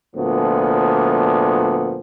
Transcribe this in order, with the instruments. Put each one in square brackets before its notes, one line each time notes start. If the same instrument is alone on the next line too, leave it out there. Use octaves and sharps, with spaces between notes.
[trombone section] D2 A#2 F3 B3